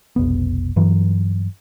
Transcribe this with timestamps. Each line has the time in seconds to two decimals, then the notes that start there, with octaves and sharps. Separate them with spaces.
0.16 F1 B1 B3
0.76 G2 E3 F#3